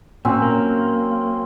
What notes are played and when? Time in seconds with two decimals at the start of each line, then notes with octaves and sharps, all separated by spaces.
0.25 A#2 F#3 C4 C#4
0.42 A#3